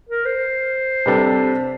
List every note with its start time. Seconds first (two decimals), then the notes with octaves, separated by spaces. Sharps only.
0.09 A#4
0.26 C5
1.06 C3 G3 D4 A4